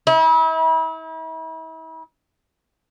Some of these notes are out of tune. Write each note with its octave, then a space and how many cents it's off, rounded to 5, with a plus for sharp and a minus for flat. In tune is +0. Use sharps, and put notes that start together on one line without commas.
E4 -40